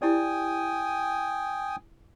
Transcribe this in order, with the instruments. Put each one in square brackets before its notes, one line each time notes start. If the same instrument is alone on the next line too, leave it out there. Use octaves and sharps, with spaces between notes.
[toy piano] E4 G4 D5 [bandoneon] G5 G#5 D#6